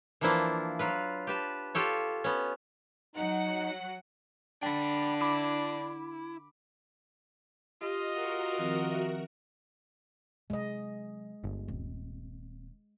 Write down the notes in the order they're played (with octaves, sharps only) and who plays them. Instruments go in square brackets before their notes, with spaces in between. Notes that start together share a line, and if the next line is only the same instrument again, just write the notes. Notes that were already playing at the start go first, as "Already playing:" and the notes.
[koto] E3 F3 A#3 D4 E4 F4
F#3 F4 B4
G4 B4 A5
F4 G4 A4 C#5
B3 C#4
[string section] F#3 F#5 [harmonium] D#4
[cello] D3 [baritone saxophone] D4 [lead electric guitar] G5 B5
[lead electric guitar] E4 [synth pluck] B5 D6
[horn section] F4 D#5 [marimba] G4
[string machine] F#4 A#4
[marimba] D#3 F3 C4
E5
[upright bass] C3 F#3 [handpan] G#3 D#5
[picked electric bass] G1
[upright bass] D#1 C4